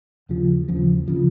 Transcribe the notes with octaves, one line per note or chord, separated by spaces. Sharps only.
D#2 C#3 F3
D#2 C#3 F3
C#3 F3